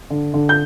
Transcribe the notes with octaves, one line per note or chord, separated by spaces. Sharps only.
D3
D3
G6